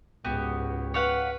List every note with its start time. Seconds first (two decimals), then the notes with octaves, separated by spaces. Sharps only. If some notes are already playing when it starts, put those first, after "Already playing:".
0.25 C#2 G#2 B3 F#4 G4
0.94 B4 C#5 F5 F#5